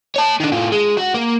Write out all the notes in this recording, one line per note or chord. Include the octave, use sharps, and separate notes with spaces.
C#5 A5
D#3 D4
A2 F4
G#3
F#4
A#3